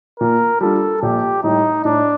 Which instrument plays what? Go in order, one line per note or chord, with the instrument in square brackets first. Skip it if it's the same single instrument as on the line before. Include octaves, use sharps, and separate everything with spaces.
[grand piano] A#2 [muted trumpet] A#4
[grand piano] G3 D4 F4 [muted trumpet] A4
[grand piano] A#1 [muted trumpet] G4
[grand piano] A2 G3 [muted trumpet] D#4
[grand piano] A2 [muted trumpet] D4